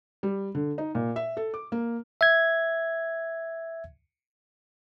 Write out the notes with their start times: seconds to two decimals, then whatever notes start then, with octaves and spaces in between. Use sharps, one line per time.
0.23 G3
0.55 D3
0.78 D#4
0.95 A#2
1.16 E5
1.37 A4
1.54 D6
1.72 A#3
2.21 E5 G#6